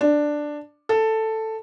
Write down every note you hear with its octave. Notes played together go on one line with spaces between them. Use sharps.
D4
A4